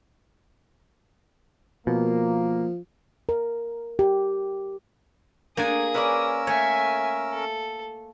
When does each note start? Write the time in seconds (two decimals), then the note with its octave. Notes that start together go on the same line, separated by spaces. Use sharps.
1.87 B2 F3 A#3
3.29 A#4
3.99 G4
5.57 A3 A#3 D4 G#4 A#4 G#5 D#6
5.94 C#4 A#4 B4 C#5 D5 E6
6.47 A3 C#5 E5 G#5
7.32 A4